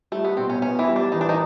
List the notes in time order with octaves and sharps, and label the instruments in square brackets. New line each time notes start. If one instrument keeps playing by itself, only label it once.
[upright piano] G3 [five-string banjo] A3
[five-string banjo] B3
[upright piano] B2 [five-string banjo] C4
[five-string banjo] C#4
[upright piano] B3 [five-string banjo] C#4
[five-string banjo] E3 E4
[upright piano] G3
[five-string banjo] D4
[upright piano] E3 [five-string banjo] D#4
[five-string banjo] D4
D#3 D#4